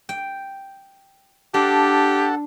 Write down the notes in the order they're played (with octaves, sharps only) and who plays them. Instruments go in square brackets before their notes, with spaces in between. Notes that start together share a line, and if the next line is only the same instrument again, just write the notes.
[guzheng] G5
[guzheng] D4 [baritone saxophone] G4 [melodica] A4 F#5 A5